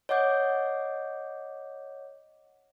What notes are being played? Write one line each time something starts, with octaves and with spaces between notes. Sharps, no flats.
C#5 D#5 F#5 D6 G6